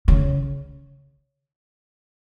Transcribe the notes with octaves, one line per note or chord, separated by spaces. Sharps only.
C#3